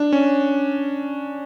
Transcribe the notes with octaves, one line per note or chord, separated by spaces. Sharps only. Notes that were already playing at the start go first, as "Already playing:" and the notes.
Already playing: D4
C#4